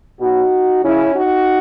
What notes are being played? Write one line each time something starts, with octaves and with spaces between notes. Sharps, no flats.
B2 F#3 D#4 F#4
C#3 F#3 C#4 E4
D#4 F#4